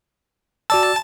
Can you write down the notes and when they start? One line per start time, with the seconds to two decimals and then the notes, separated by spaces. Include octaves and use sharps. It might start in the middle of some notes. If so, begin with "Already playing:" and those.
0.70 F#4 D5 A5 E6